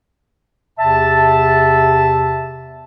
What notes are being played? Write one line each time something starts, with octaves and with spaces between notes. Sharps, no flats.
E2 C3 E5 A5